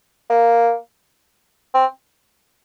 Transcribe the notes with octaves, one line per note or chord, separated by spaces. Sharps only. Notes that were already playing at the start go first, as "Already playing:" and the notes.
A#3
C4